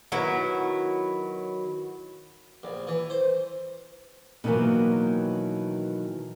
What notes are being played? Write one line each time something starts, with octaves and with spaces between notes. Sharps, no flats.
D#3 F#3 B3 E4
A#1
E3
C5
B2 D#3 E3 F#3 A#3